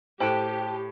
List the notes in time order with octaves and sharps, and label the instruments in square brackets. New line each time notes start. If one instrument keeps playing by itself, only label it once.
[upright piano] A2 [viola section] G4 [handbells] C5 F#6 [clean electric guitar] G5 A5